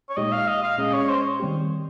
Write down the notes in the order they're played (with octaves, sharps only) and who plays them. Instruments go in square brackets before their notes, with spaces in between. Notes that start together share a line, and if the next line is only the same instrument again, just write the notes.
[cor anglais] C#5
[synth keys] A#2 G#3 D#4 G4 [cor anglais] D#5
[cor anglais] F5
D#5
F5
[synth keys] A#2 G#3 C#4 G#4 [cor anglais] D#5
[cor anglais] C#5
C5
[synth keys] D#3 G3 C4 G4